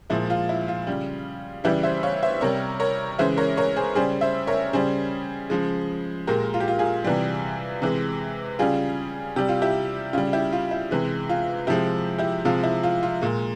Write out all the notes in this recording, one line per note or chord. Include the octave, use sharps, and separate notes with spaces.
A#2 F3 G#3 E4
F4
E4
F4
C#3 G3
C#3 E3 G3 E4 G4
C5 E5
C#5 F5
C5 E5
C3 G3 A#4 C#5
A#4 C#5
C#3 E3 G#3 C5 E5
A#4 C#5
A#4 C#5
G#4 C5
C#3 G3 G#4 C5
C5 E5
A#4 C#5
C#3 G3 G#4 C5
C#3 F3 G#3
A#2 G#3 G4 A#4
F4
G4
F4
F4 G#4
C3 E3 G3
C3 E3 G#3
C#3 G3 F4 G#4
C3 G3 G4
F4
E4 G4
C#3 G3 F4
E4 G4
F4
E4
C3 E3 G#3
F4
C3 F3 G#3 E4 G4
E4 G4
C3 F3 G#3 F4
E4
F4
F4
A#2 G#3